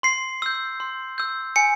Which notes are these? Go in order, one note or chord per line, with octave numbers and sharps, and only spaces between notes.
C6 C7
E6 G6
C6
E6 G6
G#5 C#7